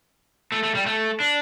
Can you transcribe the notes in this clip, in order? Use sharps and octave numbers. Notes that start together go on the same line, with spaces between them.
A3
A3
G3
A3
D4